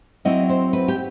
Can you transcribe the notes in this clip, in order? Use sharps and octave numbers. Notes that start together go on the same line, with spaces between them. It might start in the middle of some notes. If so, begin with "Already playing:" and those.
F#3 C4 E4 D#5
C5
B4
G4